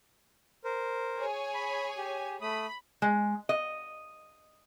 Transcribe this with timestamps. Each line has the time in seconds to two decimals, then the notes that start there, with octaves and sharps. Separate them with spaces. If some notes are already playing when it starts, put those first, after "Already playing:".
0.64 A#4 C5
1.18 G#4 C#5 G#5
1.54 B5
1.97 G4
2.41 A3 B5 D#6
3.02 G#3
3.49 D#5